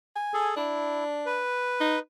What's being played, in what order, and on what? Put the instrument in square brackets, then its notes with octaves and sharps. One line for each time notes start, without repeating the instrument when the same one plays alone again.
[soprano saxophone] G#5
[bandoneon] G#4 A4
[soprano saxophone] D4 [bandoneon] E4
[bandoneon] B4
[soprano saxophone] D#4